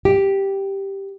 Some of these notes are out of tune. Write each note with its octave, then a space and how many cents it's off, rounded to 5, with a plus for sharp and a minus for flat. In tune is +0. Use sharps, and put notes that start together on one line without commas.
G4 +0